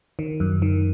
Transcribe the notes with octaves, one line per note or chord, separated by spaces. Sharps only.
D#3
F#2
D#3